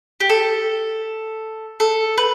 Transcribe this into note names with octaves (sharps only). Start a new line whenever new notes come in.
G4
A4
A4
B4